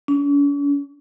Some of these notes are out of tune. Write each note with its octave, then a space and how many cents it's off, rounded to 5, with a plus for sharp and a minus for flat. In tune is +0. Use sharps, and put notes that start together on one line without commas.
C#4 +45